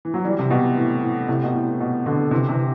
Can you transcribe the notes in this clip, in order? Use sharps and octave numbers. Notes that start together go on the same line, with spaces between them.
E3
F#3
E3 G3
C3
B2
A2
A2
A2 C3
B2
A2
B2
B2 D3
C3 E3
C3 E3